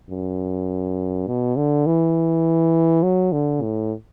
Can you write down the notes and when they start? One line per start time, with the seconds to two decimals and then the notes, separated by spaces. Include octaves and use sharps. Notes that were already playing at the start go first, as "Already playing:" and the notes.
0.10 F#2
1.27 B2
1.57 D3
1.86 E3
3.03 F#3
3.33 D3
3.62 A2